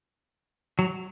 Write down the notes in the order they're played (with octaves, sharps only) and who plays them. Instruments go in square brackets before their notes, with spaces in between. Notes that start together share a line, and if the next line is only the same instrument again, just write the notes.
[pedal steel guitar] F#3